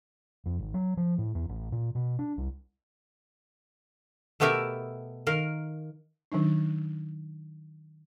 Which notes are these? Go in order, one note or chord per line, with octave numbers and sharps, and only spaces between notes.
F2
G#1
F#3
F3
A2
E2
A1
A#2
B2
D4
C2
B2 A3 B3 G4 A#4 E5
D#3 A#4 F5
D#3 F#3 D4 D#4